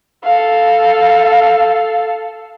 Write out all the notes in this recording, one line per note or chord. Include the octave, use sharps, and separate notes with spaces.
A4 F5